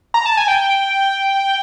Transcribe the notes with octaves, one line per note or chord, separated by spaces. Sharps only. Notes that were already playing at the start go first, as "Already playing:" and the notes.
A#5
A5
G#5
G5